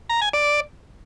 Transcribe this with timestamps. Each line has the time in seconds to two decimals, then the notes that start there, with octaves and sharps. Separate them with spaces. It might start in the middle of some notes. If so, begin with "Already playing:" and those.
0.09 A#5
0.21 G#5
0.33 D5